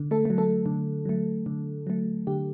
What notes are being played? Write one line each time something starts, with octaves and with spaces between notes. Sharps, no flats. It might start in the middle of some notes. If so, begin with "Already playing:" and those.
Already playing: D3
A3 A4
A3
F#3
A3 A4
D3
F#3 A3
D3
F#3 A3
D3 G4